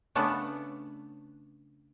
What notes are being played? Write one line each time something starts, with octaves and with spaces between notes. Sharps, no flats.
C#3 A3 B3 D4 A4